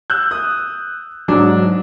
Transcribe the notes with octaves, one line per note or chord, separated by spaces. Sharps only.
E6 F#6 G6
D#6
G#2 F#3 D4